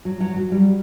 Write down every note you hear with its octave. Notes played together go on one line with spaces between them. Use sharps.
F#3
F#3
F#3
G3